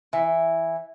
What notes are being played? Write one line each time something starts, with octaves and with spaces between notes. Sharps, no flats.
E3